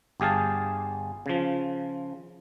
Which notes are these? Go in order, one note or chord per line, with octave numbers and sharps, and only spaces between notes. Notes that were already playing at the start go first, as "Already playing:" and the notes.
G1 G4 G#4 F5 A5
C#3 F3